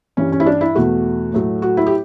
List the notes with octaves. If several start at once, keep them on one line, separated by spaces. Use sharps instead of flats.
G2 E3 G3 C#4
C#4
E4
D4
E4
E2 B2 A3 F#4
A2 F#3 A3
F#4
E4
G4